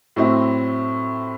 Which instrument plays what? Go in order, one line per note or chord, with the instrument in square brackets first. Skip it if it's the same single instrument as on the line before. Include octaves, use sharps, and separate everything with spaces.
[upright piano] A2 F#3 C4 E4